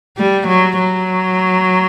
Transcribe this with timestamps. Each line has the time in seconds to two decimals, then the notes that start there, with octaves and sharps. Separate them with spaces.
0.17 G3
0.47 F#3
0.78 F#3